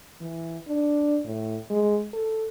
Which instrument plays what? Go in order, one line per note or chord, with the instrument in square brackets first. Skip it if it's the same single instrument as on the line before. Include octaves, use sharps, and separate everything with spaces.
[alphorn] E3
D4
A2
G#3
A4